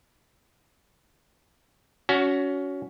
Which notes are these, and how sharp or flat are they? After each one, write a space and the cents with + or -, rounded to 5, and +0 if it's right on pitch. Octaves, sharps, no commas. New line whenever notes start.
C#4 +20 F#4 +0